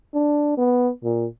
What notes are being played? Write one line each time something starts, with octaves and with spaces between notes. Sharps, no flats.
D4
B3
A#2